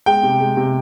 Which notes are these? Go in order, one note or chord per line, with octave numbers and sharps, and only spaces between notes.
G#3 G5
C3
G#3
C3